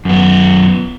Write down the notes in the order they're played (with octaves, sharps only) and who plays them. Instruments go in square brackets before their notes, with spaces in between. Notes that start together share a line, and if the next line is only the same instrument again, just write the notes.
[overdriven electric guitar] F#2 B3